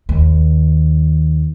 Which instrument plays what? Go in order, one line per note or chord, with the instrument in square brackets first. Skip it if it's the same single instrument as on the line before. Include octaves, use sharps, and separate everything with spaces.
[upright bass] D#2